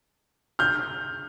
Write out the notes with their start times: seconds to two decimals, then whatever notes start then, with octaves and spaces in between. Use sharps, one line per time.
0.59 F6 G6